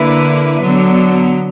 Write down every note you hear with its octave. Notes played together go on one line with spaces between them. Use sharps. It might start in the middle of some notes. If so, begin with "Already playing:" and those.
Already playing: D3 A#3 E4 B4
D3 F#3 B3